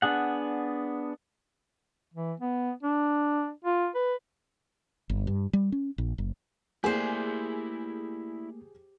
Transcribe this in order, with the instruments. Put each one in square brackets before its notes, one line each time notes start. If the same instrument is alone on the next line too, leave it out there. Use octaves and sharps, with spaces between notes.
[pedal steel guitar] B3 D4 G#4 F#5
[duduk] E3
B3
D4
F4
B4
[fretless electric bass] G1
G2
G3
C#4
A#1
F#1
[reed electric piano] A3 A#3 [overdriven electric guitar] E4 D5 [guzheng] G4 C5 [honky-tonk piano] G#4 G#5